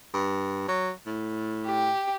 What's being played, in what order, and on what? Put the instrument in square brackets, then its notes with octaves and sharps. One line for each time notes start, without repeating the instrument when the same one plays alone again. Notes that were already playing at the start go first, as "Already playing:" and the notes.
[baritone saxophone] G2
F#3
A2
[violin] G4